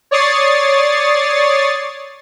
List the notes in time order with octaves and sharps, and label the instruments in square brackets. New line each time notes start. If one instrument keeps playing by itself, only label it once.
[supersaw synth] C#5 D5 C#6 D#6 A6 C7